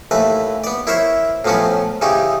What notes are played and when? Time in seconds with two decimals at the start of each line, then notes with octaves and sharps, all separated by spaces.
0.11 D#2 E3 A3 B4
0.64 B3 D5
0.87 E4 A#4 C5 C#5 E5
1.45 A2 F3 F#3 B3 C#4 F#4
2.01 C#3 E3 C#4 D#4 G4